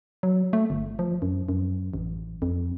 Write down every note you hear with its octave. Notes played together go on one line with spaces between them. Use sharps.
F#3
A3
G1
F3
F#2
F#2
A1
F2